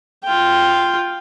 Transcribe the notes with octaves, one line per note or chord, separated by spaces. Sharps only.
F4 G5